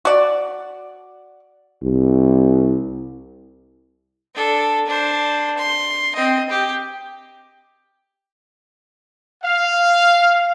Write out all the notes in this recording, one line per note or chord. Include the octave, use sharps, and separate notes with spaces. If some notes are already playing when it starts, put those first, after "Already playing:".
F#4 D5
C2
D4 A4
D4 C5
C6
C4 D#5
G4
F5